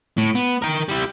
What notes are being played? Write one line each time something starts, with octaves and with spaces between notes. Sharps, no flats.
A2
B3
A#4 G5
G3 E4